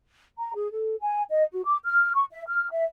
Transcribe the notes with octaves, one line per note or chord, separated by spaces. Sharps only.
A#5
G#4
A4
G#5
D#5
F#4
D6
F6
C#6
E5
F6
E5